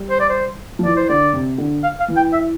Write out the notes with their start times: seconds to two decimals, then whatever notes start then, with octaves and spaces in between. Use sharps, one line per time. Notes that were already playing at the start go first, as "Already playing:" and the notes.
Already playing: G3
0.10 C5
0.20 D5
0.29 C5
0.79 F3
0.84 E3 D5
0.97 C5
1.09 D3 D5
1.33 C3
1.58 D3
1.83 F5
2.00 F5
2.08 E3
2.17 G5
2.33 E5